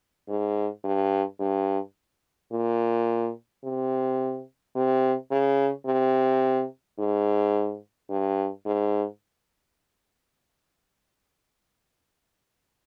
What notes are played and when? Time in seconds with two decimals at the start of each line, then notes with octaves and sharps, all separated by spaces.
0.28 G#2
0.84 G2
1.40 G2
2.52 A#2
3.64 C3
4.76 C3
5.31 C#3
5.86 C3
6.99 G#2
8.10 G2
8.66 G#2